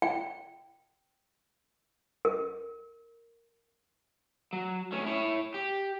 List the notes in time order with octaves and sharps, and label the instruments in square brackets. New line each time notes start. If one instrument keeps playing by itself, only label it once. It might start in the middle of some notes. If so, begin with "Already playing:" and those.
[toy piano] G5
A#4
[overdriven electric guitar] F#3
A3 C#4
E4 C#5
G4